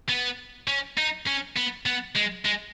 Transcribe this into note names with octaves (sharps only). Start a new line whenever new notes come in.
B3
C#4
D#4
C#4
B3
B3
G#3
G#3